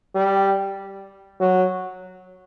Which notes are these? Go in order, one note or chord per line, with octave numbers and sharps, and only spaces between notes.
G3
F#3